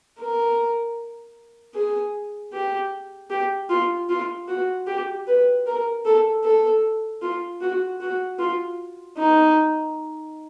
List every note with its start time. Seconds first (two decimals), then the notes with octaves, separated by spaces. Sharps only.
0.19 A#4
1.75 G#4
2.53 G4
3.30 G4
3.70 F4
4.09 F4
4.48 F#4
4.87 G4
5.27 B4
5.66 A#4
6.05 A4
6.44 A4
7.22 F4
7.61 F#4
8.01 F#4
8.39 F4
9.17 D#4